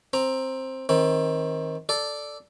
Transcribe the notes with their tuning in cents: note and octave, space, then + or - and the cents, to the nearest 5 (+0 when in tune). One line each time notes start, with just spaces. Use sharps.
C4 +10 A#5 +0
D#3 +25 C4 +25
A4 +0 D5 +0